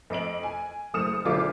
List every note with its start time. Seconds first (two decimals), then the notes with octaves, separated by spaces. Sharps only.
0.10 F2 D#5 D7 F#7
0.43 G#5
0.94 F#1 A3 D#6 F6 C#7 E7
1.25 F#1 B1 D3 F4 E5 D6